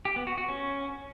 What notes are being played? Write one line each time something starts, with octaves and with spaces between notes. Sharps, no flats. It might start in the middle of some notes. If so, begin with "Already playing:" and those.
G4
B3
F#4
F#4
C#4